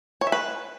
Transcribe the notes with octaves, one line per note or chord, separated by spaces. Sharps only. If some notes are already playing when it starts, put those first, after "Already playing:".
C#5
E5
B4